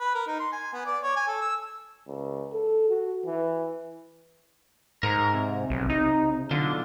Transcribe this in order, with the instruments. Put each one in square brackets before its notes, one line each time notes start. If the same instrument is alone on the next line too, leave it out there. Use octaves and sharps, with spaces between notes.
[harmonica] B4
A#4
D#4
C6
G#5
B3
D5
C#5
G#5
A4
E6
[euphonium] C#2
A4
F#4
E3
[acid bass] G#2 [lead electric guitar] A#4 A#5
[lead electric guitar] C3
[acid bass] B1
D#4
[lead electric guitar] B1 F4 [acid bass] D3